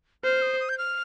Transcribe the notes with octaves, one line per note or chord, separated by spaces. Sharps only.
C5 F6
D#6
D#6
G6
F6